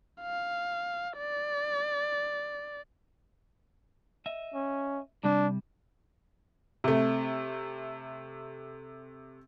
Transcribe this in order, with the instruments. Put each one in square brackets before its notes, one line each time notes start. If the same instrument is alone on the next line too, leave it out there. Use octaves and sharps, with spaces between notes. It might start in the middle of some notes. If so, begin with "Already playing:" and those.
[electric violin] F5
D5
[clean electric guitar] D#5 E5
[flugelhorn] C#4
[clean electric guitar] C3 G3 [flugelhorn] D4
[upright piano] C3 A3